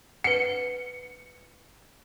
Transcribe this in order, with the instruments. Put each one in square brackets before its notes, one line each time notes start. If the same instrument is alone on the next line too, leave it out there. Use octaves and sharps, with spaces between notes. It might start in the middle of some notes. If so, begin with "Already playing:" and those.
[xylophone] B4 F#5 [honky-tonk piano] C#7